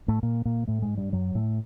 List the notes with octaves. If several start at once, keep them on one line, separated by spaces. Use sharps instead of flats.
A2 A3
A#2 A#3
A#2 A#3
A2 A3
G#2 G#3
G2 G3
F#2 F#3
A2 A3